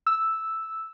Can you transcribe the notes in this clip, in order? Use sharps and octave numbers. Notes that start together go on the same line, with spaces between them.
E6